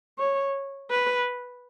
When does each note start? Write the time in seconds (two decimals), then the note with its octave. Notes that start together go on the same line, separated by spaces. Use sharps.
0.19 C#5
0.91 B4